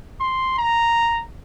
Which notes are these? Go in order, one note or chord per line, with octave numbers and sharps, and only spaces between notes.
C6
A#5